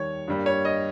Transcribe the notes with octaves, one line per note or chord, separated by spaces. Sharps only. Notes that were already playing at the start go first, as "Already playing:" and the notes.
Already playing: D#2 D#3 G3 C#5
G2 G3 A#3
C#5
D#5